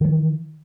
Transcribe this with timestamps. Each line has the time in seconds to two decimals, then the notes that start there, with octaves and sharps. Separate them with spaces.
0.01 D#3
0.05 F#3
0.08 E3